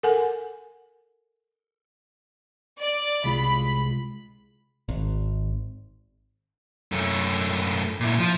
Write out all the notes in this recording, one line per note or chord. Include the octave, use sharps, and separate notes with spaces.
A4 A#4 F#5 G#5
D5
C2 G#3 F4 B5
G#1
F#2 A3
A#2 E4
F3 F4